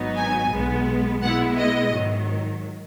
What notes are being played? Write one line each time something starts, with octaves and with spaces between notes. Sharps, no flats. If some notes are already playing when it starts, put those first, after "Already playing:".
Already playing: G#1 G#2 F#3 B3 D#4
G#5
B1 B2 G#3 B3
B2 G#3 B3 E4 F#5
D#5
G#2 D#3 F#3